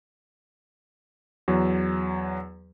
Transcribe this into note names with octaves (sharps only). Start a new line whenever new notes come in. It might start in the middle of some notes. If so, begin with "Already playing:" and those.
E2 F#3